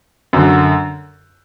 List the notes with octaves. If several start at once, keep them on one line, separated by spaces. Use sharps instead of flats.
F#2 D3